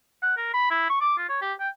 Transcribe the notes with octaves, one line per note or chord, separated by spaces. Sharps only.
F#5
A#4
B5
E4
C#6
D6
F4
C#5
G4
G5